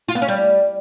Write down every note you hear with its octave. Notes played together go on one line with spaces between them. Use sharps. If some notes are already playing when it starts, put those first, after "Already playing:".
F4
B3
C#4
G3